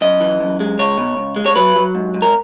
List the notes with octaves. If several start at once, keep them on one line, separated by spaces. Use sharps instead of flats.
F#2 D#5
E3
F#2
G#3
C#2 C#5
B2
C#2
G#3
C#5
F#3 B4
F#3
G#2
G#2
A#4